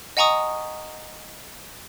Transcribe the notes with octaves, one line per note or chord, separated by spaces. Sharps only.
D#5 F#5 G#5 A#5 C#6 D#6